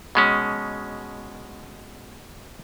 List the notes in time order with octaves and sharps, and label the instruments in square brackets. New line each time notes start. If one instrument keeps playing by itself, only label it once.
[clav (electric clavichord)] B2 G#3 C#4